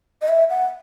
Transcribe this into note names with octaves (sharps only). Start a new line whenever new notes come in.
D#5
E5
F#5